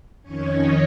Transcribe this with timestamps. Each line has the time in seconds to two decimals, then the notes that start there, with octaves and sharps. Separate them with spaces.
0.23 F2 D#3 C#4 C#5
0.56 D#5